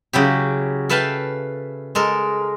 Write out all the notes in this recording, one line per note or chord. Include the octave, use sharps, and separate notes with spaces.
C#3 F#3 E4 G4
A4 B4 E5 F5 G5 A5
G#3 A4 A#4